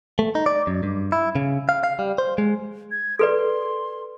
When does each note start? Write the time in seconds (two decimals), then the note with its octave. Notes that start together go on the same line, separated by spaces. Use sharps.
0.19 A3
0.35 D#4
0.46 D5
0.67 F#2
0.83 G2
1.12 E4
1.35 C#3
1.69 F5
1.84 F5
1.99 G3
2.18 C5
2.38 G#3
2.91 G#6
3.19 A4 B4 D5 C6